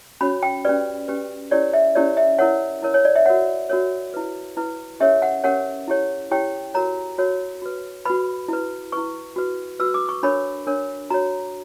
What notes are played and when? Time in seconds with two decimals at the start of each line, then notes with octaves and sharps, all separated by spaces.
0.21 C#4 F#4 C#5 B5
0.43 G5
0.65 C#4 G4 B4 D5
1.08 C#4 G4 B4
1.51 C#4 E4 G4 A#4 C#5 D5
1.73 E5
1.95 C#4 E4 G4 A#4 C#5 D5
2.17 E5
2.39 E4 A#4 C#5 F#5
2.82 E4 A#4 C#5
2.94 C#5
3.05 D5
3.16 E5
3.26 F#4 A#4 C#5 F#5
3.70 F#4 A#4 C#5
4.14 E4 B4
4.57 E4 B4
5.00 C#4 G4 A#4 C#5 E5
5.22 F#5
5.44 C#4 G4 A#4 C#5 F#5
5.88 E4 G4 C#5
6.31 E4 G4 C#5 G5
6.74 F#4 A#4 C#5 A#5
7.18 F#4 A#4 C#5
7.62 F#4 B4
8.05 F#4 B4 B5
8.48 E4 B4
8.92 E4 B4 C#6
9.36 F#4 B4
9.80 F#4 B4 E6
9.94 D6
10.09 C#6
10.23 D4 A#4 C#5 B5
10.67 D4 A#4 C#5
11.10 F#4 C#5 A#5